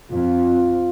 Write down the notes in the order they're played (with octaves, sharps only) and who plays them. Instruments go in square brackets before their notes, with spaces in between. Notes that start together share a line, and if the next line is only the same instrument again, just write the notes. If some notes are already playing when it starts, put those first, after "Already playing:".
[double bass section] F2 [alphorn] F4